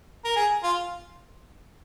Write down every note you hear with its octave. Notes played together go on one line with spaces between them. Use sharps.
A#4
G#4
F4